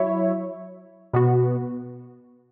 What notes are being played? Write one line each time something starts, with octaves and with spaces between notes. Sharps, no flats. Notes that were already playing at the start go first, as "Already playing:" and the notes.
Already playing: F#3 E4 C#5 E5
B2 B3 F#4